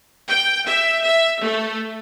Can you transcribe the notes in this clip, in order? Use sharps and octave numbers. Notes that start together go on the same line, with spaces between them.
G5
E5
E5
A3